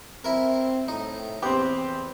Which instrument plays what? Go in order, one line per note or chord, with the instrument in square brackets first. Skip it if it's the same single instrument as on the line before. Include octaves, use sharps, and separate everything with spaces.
[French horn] C4 [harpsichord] E4 A#4
[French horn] A2 [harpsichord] D#4
[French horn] E2 [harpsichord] B3 [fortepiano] C4 G4